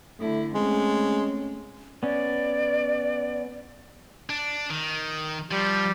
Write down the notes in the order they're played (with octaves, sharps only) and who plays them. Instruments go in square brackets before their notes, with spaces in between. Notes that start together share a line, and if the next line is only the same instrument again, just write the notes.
[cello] D3 E4 [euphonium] A3
[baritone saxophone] G#3 [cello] A3 C4 [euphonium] C#4
[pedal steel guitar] B3 C#4 [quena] D5
[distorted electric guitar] D4
D#3
[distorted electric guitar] F3 [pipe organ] G3